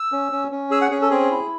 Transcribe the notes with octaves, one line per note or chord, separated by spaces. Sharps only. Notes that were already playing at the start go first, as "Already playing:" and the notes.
Already playing: E6
C#4
C#4
C#4
G#4 E6
F#5
C#4 G#4
A4
C4 G#4
E4